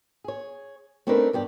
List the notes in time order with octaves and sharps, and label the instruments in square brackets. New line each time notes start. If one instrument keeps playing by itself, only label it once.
[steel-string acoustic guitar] G#4 C#5
A3 C4 D4 D#4 A#4 B4
E2 G2 G4 D5